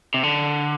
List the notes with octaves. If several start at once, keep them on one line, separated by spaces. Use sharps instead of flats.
C3
D3